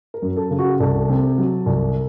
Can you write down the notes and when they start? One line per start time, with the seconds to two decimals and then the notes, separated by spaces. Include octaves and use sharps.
0.14 A#4
0.22 F#2
0.36 A4
0.51 C#3
0.59 F#4
0.80 C2 A4
1.09 C3
1.38 F#3
1.66 C2